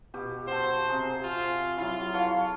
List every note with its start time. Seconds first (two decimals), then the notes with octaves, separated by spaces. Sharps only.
0.14 B2 G4
0.47 F#4 A4 C5
0.87 C3 G#4 A#5
1.24 F4
1.77 F#3 E4 F4
2.13 A4 C#5 F5